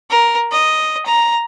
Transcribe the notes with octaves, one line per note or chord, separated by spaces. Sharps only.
A#4
D#5
A#5